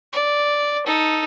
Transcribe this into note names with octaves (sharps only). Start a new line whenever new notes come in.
D5
D#4 A4